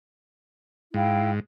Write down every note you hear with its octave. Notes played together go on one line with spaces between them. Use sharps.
G#2 E4 F5 G5